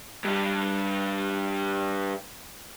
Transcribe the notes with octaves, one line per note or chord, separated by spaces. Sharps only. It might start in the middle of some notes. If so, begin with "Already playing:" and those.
G2 G3